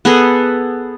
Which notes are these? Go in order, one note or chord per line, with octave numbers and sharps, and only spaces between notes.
B3 G#4 A4